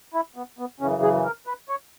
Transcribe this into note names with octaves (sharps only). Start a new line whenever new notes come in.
E4
B3
B3
F#2 C#3 E3 C#4
G#4
A#4
B4
C#5